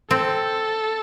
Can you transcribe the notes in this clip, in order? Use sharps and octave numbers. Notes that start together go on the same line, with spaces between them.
C4 A4